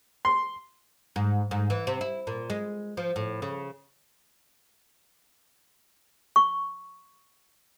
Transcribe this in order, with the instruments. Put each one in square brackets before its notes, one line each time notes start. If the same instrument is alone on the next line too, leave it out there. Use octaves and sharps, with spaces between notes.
[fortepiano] C6
[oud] G#2
G#2
E3
C3
E4
A#2
G#3
F3
A2
C#3
[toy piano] C#6